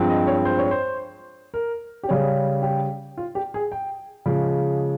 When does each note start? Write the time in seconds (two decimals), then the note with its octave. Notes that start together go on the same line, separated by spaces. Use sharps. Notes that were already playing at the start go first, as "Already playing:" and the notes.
Already playing: G2 F3 G#3 C4
0.09 D#5
0.27 C#5
0.45 C5
0.59 C#5
0.71 C5
1.54 A#4
2.03 G4
2.08 C#3 G3 C#4 G#4
2.62 G4
3.17 F4
3.35 G4
3.54 G#4
3.72 G5
4.26 C#3 F3 G#3